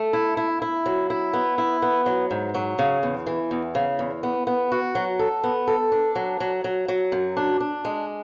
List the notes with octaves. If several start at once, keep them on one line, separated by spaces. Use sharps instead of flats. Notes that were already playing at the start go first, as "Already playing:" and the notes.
Already playing: A3
E4
E4
E4
F#3
E4
B3
E4
B3
F#3
G#2
F#3
C#3
E2
E3
E2
C#3
E2
B3
B3
F#4
F#3
A4
B3
A4
D4
F#3
F#3
F#3
F#3
F#2
D4
D4
G#3